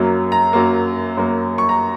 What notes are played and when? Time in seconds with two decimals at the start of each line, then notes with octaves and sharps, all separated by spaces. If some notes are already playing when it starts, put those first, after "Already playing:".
Already playing: F#2 F#3 A#3
0.32 A#5
0.53 F#2 F#3 A#3
1.17 F#2 F#3 A#3
1.58 C#6
1.69 A#5